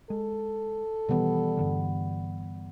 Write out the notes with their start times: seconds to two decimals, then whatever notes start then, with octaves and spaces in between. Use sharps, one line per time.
0.10 G#3 A4
1.09 B2 D#3 E3 G3 B3
1.57 G2 D3 E3